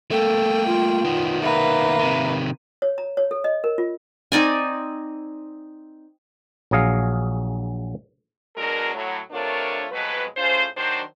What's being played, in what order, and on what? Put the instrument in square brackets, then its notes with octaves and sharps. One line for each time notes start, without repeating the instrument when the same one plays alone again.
[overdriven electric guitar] A3 A#3 [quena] A4 [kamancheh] G5
[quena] F4
[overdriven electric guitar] D#3 B3
[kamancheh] A#3 B4 [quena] E5
[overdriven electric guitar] C3 D#3
[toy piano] C#5
A#5
C#5
A4
D#5
A#4
F4
[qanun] C4 D#4 D5 G#5
[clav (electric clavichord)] A#1 F#3 G#4 F5
[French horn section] B2 F#3 G#3 D4 A#4
A2 F#3
C3 A3 D4 F4 A#4 C#5
F2 B2 F#3 G#3 B4
A2 C#4 F4 G#4 C5
D#3 F#3 D4 C5